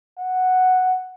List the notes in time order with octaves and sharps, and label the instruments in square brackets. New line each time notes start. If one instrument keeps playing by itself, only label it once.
[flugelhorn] F#5